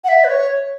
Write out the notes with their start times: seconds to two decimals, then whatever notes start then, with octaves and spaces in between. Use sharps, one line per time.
0.04 F#5
0.09 E5
0.24 B4
0.29 C#5